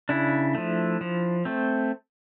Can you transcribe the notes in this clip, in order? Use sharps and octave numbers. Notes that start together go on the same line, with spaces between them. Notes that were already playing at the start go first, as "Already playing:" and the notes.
C#3 D4 E4
F3 A3
F3
A3 C4